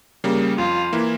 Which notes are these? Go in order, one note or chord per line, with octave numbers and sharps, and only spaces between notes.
C#3 G3 A#3
F2 F4
E3 A#3 E4